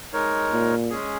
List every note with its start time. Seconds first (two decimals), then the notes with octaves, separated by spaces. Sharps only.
0.13 G#3 D#4 A#4 C#5
0.52 A#2
0.90 G#3 C#4 G#4